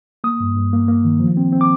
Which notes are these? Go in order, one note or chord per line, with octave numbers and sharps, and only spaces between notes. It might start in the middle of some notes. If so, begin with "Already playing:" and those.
A#3 D#6
G2
G2
A#3
A#3
D#3
F3
C4
C4
D6